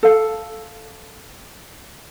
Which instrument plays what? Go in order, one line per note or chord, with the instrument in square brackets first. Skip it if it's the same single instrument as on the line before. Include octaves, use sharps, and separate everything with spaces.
[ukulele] A4 F5